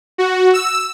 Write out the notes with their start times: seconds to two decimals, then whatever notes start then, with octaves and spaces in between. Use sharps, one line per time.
0.18 F#4
0.53 E6